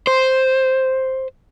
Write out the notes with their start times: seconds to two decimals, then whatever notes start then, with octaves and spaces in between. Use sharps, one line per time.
0.07 C5